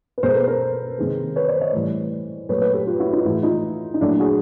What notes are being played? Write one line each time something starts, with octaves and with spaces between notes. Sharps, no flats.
B4
B2 G#3 A#4 C5
A4 B4
A#4 C5
C3 D#3 G#3
B4 C#5
C5 D5
C#5 D#5
A2 E3 G3
A#2 F#3 A3 B4 C#5
B4 C#5
G4 A4
F4 G4
E4 F#4
D#4 F4
A2 E3 G#3 E4 F#4
D#4 F4
D#4
A#2 F#3 A3 D4 E4
F#4 G#4